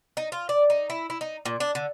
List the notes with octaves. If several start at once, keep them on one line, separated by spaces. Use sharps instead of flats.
D#4
F4
D5
D#4
E4
E4
D#4
A#2
D4
D3